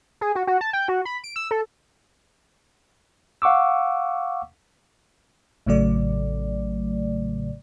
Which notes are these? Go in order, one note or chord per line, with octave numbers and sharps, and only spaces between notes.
G#4
F#4
F#4
A5
G5
F#4
B5
D7
E6
A4
F5 F#5 C#6 D6 E6
A1 A2 C#3 F#3 A3 D5